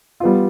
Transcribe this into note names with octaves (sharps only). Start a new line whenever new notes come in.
G3 B3 F4